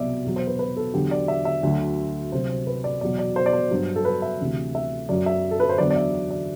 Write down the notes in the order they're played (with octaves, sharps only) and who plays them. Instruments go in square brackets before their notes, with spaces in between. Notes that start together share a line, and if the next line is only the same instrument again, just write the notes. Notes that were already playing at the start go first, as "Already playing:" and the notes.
Already playing: [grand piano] C2 B2 F#3 D5 E5
E2 B2 F#3
C5
B4
B4
A4
E2 D3 F#3 G4
D5
E5
E5
D2 D3 F#3
C2 C3 F#3 C5
C5
B4
D5
E2 B2 F#3 D5
D5
C5
D5
C5
G2 F#3
A4
B4
E5
D2 C3 E3
E5
F#2 F#3 D5
E5
A4
B4
C5
E2 D3 F#3 D5
D5
E5
D5